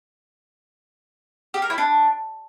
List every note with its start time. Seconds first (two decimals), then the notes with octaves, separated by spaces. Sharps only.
1.54 G4
1.62 A#4
1.70 E4
1.78 D4